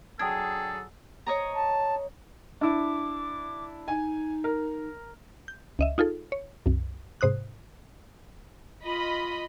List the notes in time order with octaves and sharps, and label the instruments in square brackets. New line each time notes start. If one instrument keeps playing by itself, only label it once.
[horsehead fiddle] F#3 G#4 [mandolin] D4 [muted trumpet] A4 [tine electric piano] G5 D#6 G#6
[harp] C#5 D#5 A#5
[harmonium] A5
[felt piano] D4 E4 [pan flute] D6
[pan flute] D#4 [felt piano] G#5
[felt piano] A#4
[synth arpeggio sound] G6
C#2 D#5 E5
D#4 F4 G#4 A4
C#5
C2 F#2
G#2 C3 C5 D#6 F#6
[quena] F4 [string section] D#5 B5 D#6